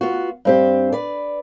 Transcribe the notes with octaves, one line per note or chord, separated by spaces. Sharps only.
B3 F4 F#4
G2 C4 G4
B4 D5